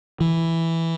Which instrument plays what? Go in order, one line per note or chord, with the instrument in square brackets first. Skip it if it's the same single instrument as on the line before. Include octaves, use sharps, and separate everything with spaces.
[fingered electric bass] E3